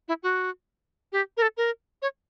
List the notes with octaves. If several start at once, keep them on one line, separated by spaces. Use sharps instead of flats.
E4
F#4
G4
A#4
A4
A#4
C#5